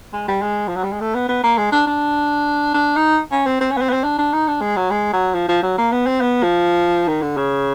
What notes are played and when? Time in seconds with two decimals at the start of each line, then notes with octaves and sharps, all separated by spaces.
0.13 G#3
0.28 G3
0.42 G#3
0.68 F3
0.76 F#3
0.83 G3
0.92 G#3
1.01 A3
1.15 B3
1.29 B3
1.44 A#3
1.58 G#3
1.72 D4
1.87 D4
2.74 D4
2.96 D#4
3.31 C#4
3.46 C4
3.61 C4
3.71 C#4
3.77 B3
3.82 C4
3.89 B3
3.93 C4
4.04 D4
4.18 D4
4.33 D#4
4.48 D4
4.62 G#3
4.76 F#3
4.91 G#3
5.13 F#3
5.34 F3
5.49 F3
5.63 F#3
5.78 A#3
5.92 B3
6.07 C4
6.21 B3
6.43 F3
7.08 D#3
7.22 D3
7.37 C#3